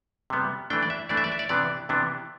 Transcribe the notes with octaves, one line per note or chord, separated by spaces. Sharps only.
C3 G3 B3
E3 A3 D4 G5
D5
E5
E3 A3 D4 D5
E5
D5
E5
D5
C3 E3 B3 D4 D5
C3 E3 B3 D4